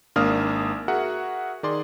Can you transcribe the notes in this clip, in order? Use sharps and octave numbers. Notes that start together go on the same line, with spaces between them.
G#1 A#3 D4 F5 D#6 F6
F#4 G#4 A#4 E5 F#5
D#3 G#4 D5 C6